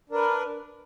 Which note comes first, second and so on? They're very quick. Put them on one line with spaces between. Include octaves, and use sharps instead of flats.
D4 A#4 B4